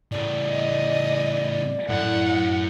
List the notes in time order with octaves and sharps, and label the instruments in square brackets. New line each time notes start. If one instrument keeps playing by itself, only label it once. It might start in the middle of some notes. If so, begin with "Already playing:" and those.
[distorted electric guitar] A2 C#3 [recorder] D5
[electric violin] D#5
[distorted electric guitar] F#2 [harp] A2 [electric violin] F#5